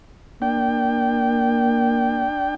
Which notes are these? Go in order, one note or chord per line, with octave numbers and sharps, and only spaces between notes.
A#3 D4 G5